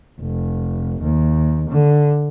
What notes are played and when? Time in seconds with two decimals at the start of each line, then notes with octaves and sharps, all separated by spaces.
0.20 F1
1.02 D#2
1.70 D3